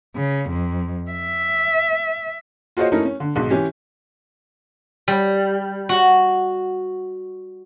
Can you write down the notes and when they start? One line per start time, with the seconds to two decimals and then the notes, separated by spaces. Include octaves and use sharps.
0.16 C#3
0.50 F2
1.10 E5
2.77 F4 F#4 G#4 C5 C#5 D#5
2.92 A3 C#4 D#4 E4 A#4
3.05 C#4
3.20 D3
3.35 B1 G#2
3.50 E3 C#4 G4 G#5
5.08 G3
5.89 F#4